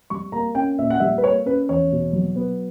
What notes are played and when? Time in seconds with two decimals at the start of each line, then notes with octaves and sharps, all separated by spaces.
0.10 G3 C#6
0.32 A#3 A#5
0.55 C#4 G5
0.79 A#2 E5
0.90 F#5
1.00 G3 E5
1.18 B4
1.23 A#3 C#5
1.46 C#4 B4
1.69 E2 C#5
1.92 B2
2.13 F#3
2.36 B3